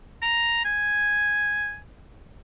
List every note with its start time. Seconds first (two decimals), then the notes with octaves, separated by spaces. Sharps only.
0.22 A#5
0.65 G#5